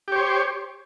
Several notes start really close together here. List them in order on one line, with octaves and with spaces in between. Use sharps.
G4 C#5 C5